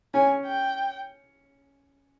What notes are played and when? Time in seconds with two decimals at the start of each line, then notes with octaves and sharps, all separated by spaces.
0.14 C#4 G#5
0.46 G5